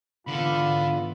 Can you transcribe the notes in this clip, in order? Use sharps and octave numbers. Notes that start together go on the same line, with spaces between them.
G#2 D3 E3 B3 F4 A4 B5